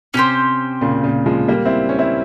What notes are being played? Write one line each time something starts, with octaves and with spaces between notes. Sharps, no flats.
C3 C#4 E4 G4 C5
A#2 C#3
A#2 C#3
F3 G#3
G3 A#3
C4 E4
C#4
C4 E4